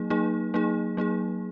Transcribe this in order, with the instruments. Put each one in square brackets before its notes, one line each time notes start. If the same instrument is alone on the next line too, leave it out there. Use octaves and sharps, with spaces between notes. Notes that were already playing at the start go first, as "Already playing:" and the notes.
Already playing: [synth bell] F#3 A#3 D#4 G#4
F#3 A#3 D#4 G#4
F#3 A#3 D#4 G#4
F#3 A#3 D#4 G#4